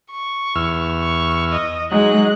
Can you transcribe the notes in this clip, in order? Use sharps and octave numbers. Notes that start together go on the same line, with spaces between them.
C#6
E2 E6 F6
C#6
D#5
F#3 G#3 D#4 F#6